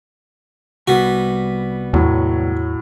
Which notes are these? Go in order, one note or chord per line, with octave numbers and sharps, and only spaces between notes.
C2 G3 B3 F#4
E2 A2 F#3